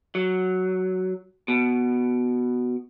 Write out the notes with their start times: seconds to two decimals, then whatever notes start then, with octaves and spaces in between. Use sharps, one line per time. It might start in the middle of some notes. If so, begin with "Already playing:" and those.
0.15 F#3
1.48 B2